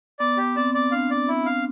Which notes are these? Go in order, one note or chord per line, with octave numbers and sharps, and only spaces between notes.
B3 D5
G4
C4 D5
D5
D4 F5
D5
E4
F5